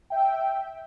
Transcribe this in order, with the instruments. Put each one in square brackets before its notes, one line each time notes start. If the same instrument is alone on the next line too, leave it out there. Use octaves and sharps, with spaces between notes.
[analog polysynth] E5 G5